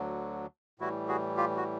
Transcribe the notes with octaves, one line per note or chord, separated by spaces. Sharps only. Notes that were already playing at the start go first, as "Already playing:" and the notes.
Already playing: D2 D3 F#3
A2 E3 G3 E4 F#4
F#4 G#4
F4 G4
F#4